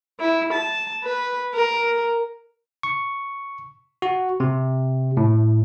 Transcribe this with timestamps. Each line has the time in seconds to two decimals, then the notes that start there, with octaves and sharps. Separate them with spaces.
0.20 E4
0.53 A5
1.04 B4
1.54 A#4
2.83 C#6
4.02 F#4
4.40 C3
5.17 A2